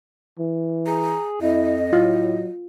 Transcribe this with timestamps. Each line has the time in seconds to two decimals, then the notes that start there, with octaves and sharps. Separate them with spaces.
0.39 E3
0.87 G#4 A#5
1.42 F2 E4 D#5
1.93 A2 F#3 F4